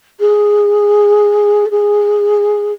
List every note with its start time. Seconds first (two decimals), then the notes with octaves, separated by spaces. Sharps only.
0.19 G#4
1.65 A4
1.70 G#4